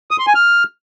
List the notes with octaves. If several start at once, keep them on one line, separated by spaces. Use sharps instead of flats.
D#6
C6
G#5
F6